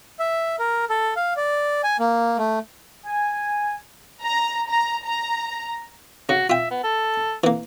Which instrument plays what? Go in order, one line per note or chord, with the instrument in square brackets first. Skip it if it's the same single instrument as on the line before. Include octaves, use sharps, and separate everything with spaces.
[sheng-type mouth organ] E5
A#4
A4
F5
D5
G#5
A#3
A3
[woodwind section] G#5
[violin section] A#5
A#5
A#5
[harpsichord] C#3 [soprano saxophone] F#4
[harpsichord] F4 G5 [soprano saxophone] E5
[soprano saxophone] B3
A4
[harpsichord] E3 A#3